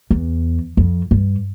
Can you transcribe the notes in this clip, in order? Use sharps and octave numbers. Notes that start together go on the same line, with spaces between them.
E2
F2
G2